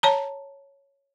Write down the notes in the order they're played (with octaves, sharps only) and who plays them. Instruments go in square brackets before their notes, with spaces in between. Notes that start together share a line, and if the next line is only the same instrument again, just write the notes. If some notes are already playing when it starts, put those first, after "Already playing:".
[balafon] C#5 A5 A#5